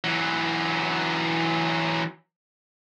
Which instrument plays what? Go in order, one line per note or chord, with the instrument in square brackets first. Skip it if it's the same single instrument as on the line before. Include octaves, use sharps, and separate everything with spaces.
[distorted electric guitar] E3 F#3